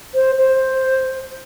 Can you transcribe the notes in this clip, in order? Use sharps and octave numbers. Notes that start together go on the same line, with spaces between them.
C5
C5